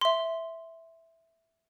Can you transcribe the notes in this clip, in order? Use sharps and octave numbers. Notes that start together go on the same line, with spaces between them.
E5 C6